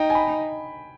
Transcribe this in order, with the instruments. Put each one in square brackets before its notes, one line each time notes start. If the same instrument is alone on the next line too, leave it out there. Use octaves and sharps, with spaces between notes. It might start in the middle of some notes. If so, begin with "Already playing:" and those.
Already playing: [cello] D#4 [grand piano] G5
[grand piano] G#5
B5